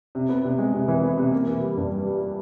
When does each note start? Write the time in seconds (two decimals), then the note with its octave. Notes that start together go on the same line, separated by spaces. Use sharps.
0.15 C3
0.29 B3
0.44 C3
0.59 G#3
0.73 C3
0.88 E3
1.03 B3
1.17 C3
1.32 A#3
1.47 E3
1.62 G3
1.77 G2
1.91 G3
2.06 G3
2.20 G3